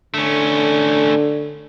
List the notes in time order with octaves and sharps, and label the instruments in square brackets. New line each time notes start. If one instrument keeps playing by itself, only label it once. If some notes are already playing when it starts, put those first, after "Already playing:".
[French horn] D3 [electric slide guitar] A3 C#4